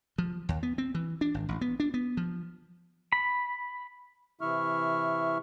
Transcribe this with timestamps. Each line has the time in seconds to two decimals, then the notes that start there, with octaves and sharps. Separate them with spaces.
0.18 F3
0.49 D#2
0.63 B3
0.78 C4
0.95 E3
1.21 D4
1.34 G#1
1.49 A1
1.61 B3
1.80 D4
1.94 B3
2.17 F3
3.12 B5
4.41 C3 E3 E4 E5 C#6 F6